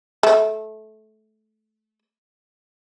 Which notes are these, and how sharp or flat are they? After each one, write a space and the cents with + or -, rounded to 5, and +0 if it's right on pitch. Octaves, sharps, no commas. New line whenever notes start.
A3 -20